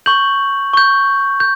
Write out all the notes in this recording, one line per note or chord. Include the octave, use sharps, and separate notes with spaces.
C#6 G6 F#7
C#6 G6
G6